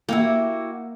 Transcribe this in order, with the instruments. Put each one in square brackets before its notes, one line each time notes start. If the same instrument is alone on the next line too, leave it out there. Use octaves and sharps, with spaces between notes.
[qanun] A#3 [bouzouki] E4 F#4 G4